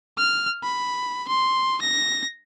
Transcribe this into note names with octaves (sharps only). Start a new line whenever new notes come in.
F6
B5
C6
A#6